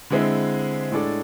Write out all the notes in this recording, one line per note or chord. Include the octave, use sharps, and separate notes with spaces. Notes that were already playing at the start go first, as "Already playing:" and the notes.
D3 G#3 C4 E4
A2 G#3 D4 A4 D5